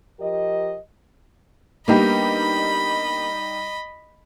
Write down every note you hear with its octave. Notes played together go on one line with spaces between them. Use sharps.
F3 G4 A#4 D#5
G3 A#3 B3 D4 D#4 G4 D#5 B5